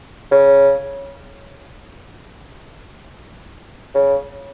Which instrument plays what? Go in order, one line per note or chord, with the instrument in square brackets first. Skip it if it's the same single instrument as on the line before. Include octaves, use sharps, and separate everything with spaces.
[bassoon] C#3
C#3